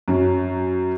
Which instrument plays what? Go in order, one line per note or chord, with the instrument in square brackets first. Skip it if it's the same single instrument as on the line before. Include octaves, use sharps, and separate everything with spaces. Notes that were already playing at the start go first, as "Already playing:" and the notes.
[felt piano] F#2 C#4